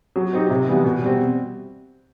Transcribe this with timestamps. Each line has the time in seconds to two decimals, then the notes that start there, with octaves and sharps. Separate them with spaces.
0.16 F#3
0.33 C4 D#4 G4
0.50 C3
0.68 E3 G3 B3
0.85 B2
1.02 G3 C4